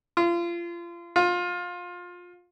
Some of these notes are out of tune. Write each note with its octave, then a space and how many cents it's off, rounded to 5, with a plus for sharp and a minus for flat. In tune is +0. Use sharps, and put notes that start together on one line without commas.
F4 -30
F4 +20